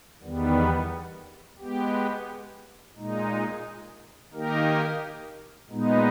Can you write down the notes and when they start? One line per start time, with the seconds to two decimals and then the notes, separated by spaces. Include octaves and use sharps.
0.21 E2 D#3 G3 B3
1.58 G#3 B3 G4
2.96 A#2 G#3 D#4
4.33 D#3 A#3 D#4 G4 A#4
5.70 A#2 G#3 B3 D#4